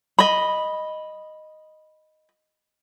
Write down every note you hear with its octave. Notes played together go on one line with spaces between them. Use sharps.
D#5 B5